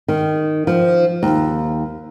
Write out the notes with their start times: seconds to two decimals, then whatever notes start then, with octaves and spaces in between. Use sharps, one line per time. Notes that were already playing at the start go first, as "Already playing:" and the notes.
0.08 D#3
0.67 F3
1.23 D#2